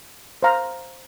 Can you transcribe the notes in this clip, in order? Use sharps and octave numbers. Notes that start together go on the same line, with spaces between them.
C5 F5 A#5